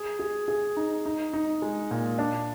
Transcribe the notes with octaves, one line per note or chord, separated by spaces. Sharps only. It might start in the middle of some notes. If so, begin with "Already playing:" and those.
Already playing: G#4
G#4
G#4
D#4
D#4
D#4
G#3
A#2
D4